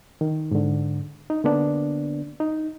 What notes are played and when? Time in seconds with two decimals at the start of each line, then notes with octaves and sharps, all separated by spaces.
0.21 D#3
0.51 G#2 D3
1.30 D#4
1.44 D3 A#3 B3 D4
2.40 D#4